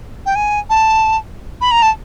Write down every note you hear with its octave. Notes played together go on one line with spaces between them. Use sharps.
G5
G#5
A5
B5
A#5
A5